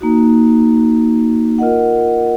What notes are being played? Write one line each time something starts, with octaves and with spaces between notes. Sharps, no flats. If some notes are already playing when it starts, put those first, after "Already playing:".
A#3 D#4 F#4
F4 A#4 D#5 F#5